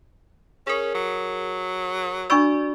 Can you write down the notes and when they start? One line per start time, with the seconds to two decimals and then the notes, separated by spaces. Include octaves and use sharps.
0.67 C#4 G#4 A#4
0.95 F#3
2.30 D4 F#4 D5 C#6 E6